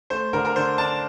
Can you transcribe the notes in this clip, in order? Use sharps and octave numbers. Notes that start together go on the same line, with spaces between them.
A3 C5
D3 A#4
A#4
D3 C5
D4 A5